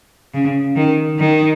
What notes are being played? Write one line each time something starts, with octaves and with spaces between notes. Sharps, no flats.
C#3
D#3
D#3